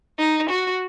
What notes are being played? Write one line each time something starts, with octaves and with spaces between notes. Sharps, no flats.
D#4
F#4